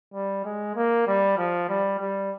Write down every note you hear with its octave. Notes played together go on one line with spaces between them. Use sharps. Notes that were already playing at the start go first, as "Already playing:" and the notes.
G3
G#3
A#3
G3
F3
G3
G3